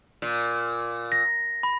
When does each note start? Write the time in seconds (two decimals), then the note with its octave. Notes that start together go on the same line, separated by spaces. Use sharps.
0.22 A#2
1.12 A#6
1.63 B5